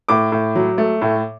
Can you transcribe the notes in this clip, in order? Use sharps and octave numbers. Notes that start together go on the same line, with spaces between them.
A2 D6
A2
F#3
A3
A2